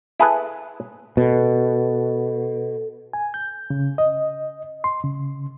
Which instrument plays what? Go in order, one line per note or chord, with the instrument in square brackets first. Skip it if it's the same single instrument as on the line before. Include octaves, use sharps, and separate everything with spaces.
[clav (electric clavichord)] E4 G#4 A4 B4
[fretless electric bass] B2 [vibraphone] A4
[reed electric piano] G#5
G6
C#3
D#5
C6
C#3